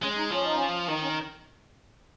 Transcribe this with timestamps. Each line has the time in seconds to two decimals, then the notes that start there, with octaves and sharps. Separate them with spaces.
0.03 G#3 C#4
0.17 D#4
0.31 F3 C#4
0.43 D#4
0.56 C#4
0.88 D#3 D#4
1.03 C#4